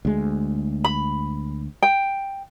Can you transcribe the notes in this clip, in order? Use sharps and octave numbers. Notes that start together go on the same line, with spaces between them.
D2 G#3
B5
G5